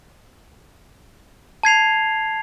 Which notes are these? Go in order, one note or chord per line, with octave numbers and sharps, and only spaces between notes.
A5 G#6 C7 F7